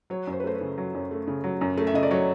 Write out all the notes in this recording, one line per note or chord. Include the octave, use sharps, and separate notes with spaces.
F#3 C#5
F#2
C5
B4
A3 C5
B4
C#3
F#3
F#2
A3
C#3
F#3
F#2
A3
E5
C#3 D#5
D5
F#3 C#5